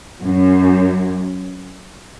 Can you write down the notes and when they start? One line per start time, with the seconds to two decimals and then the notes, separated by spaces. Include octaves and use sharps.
0.23 F#2